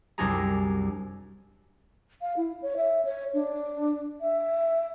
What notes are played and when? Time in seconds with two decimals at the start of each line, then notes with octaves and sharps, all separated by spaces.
0.18 C2 F#2 D4 G4 G#4 A#5
2.21 F5
2.37 E4
2.62 C#5
2.77 E5
3.05 C#5
3.34 D4
4.21 E5